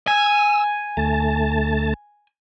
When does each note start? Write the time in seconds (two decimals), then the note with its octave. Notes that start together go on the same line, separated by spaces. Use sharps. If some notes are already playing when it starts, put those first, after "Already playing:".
0.07 G#5 E6
0.97 D2 A3 A5